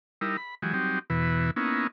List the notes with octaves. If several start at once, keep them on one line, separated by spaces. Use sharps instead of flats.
G3 D#4 E4 A#4
B5
E3 F#3 G#3 G4
F#3 G3 C4 D#4 G4
E2 B2 E3 B4
A#3 B3 C#4 D#4 E4